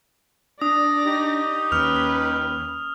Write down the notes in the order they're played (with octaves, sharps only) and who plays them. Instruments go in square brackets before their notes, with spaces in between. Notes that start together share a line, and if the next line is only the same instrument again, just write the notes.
[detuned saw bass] D4 [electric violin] D5 A#6 [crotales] D#6
[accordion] D#4 G4
[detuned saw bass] D#2 [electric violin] C#4 B4 [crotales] F6 F7